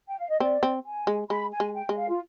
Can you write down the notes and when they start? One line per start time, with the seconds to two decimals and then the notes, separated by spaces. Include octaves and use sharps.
0.08 G5
0.19 F5
0.29 D#5
0.40 C4 D5
0.63 C4
0.85 G#5
1.07 G#3
1.30 G#3 B5
1.52 G#5
1.60 G#3
1.75 G5
1.89 G#3 D#5
1.97 F5
2.08 F4